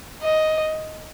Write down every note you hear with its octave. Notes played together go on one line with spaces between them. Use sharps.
D#5